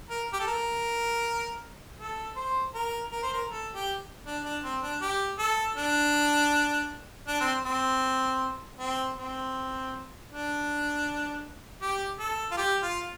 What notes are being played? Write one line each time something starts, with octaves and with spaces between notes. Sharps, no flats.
A#4
G4
A4
A#4
A4
C5
A#4
A#4
C5
A#4
A4
G4
D4
D4
C4
D4
G4
A4
D4
D4
C4
C4
C4
C4
D4
G4
A4
F4
G4
F4